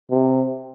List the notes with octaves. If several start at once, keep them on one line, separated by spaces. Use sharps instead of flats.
C3